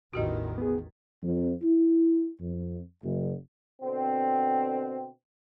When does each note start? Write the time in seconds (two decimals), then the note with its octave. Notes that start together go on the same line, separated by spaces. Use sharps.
0.13 A1 E2 D#3 F#4 G4 D#5
0.58 B3 G#4
1.23 F2
1.62 E4
2.41 F2
3.03 F#1
3.82 B2 D3 C4